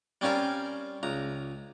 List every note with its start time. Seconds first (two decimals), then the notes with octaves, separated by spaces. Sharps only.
0.21 G3 C4 C#4 F4 A#4 C5
1.03 C#2 A#5